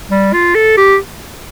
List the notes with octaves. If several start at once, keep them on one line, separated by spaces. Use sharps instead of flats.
G3
F4
A4
G4